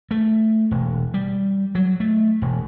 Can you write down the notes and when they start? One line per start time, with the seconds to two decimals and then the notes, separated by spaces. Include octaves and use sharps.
0.11 A3
0.71 E1
1.14 G3
1.75 F#3
2.00 A3
2.42 E1